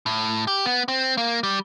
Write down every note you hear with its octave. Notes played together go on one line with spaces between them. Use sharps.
A2
G4
B3
C4
A#3
G3